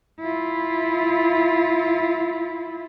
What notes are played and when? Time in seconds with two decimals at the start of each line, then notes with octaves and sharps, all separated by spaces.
0.20 E4 F4